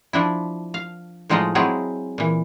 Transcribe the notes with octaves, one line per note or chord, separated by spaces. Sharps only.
F3 D4 E4
F5
A2 F3 G#3 D#4 F4 D#5
F#3 G#3 C4 E4 G#4
A#2 E3